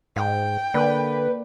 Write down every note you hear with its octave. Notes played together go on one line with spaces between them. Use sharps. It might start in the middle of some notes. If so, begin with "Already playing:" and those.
G#2 G5
D3 A#3 B4 D5